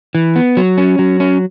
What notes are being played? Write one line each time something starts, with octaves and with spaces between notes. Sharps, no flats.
E3
B3
F#3
C#4
F#3
C#4